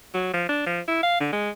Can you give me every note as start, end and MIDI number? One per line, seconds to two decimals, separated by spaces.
0.14 0.30 54
0.34 0.45 53
0.49 0.62 62
0.66 0.80 53
0.88 0.98 64
1.03 1.20 77
1.20 1.32 50
1.33 1.50 56